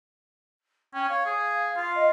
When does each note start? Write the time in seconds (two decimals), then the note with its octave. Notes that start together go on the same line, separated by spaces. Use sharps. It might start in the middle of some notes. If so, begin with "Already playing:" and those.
0.94 C#4 G5
1.09 C#5 F5
1.26 G#4
1.76 F4
1.95 D#5